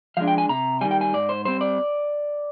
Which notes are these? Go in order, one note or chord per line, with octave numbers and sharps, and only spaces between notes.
F3 G#3 D4 F5
G5
G#5
C3 A#5
D#3 G3 G#5
G5
G#5
G#2 D5
C5
G3 C4 C5
D5